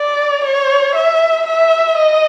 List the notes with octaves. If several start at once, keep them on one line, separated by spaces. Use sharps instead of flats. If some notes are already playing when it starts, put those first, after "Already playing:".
Already playing: D5
C#5
E5
E5
D#5